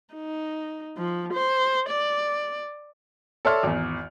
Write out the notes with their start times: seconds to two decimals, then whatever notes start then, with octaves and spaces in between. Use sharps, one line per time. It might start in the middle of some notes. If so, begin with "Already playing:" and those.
0.14 D#4
0.98 F3
1.34 C5
1.89 D5
3.45 A4 C#5 D5 E5 C6 F6
3.63 G#1 E2